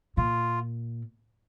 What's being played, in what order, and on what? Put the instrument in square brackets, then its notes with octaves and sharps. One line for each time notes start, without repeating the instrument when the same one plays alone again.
[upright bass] A#2 [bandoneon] F4